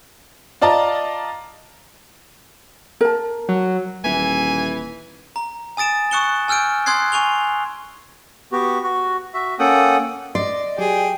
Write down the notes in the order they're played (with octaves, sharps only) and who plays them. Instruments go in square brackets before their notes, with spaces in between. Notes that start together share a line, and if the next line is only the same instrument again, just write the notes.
[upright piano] F4 D5 D#5 A5 A#5
[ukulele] A#4 A5
[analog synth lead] F#3
[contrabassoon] D#1 [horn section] E3 [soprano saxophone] G#5
[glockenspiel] A#5
G#5 D#6 A6 D7 E7
C#6 D#6 F#6 C#7 E7 G7
G#5 E6 F6 G6 D7
C6 D#6 F#6 G#6 C7
G#5 C#6 F7 G7
[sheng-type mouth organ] B3 F#4 G4
F#4
F#4 E5
A#3 C#4 A4 F#5 G5 D#6
[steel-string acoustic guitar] D5 [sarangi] D#5 [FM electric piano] C6
[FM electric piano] F#3 G4 [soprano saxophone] G#4 [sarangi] G5